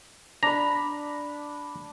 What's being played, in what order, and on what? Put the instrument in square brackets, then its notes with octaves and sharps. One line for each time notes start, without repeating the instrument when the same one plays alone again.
[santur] D4 B5 [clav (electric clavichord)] A#5